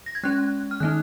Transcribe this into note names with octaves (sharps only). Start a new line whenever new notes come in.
A#6
G#6
G#3 C#4 F#6
F6
D#3 A#3 D#4 F#6